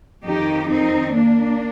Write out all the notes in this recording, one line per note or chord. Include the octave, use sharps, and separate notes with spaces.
F2 D#3 D#4 G4
C4 D#4
A#3 D4